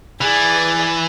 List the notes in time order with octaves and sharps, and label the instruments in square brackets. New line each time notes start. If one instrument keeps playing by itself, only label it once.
[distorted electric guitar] E3 [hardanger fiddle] G#4 D5